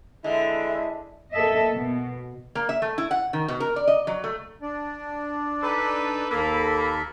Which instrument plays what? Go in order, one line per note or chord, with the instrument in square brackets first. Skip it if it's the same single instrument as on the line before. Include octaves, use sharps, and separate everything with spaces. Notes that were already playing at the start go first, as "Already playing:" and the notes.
[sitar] D3 [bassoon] G#3 [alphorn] E4 [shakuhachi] E5
[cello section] A#3 A4 D#5 E5
B2
[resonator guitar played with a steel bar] A#3
E5
A3
E4
F#5
D#3
B2
A#4
D5
D#5
F#3
A3
[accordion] D4 D5
[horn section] D#4 A4 B4
[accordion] D#2 A4 B5 [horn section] A#3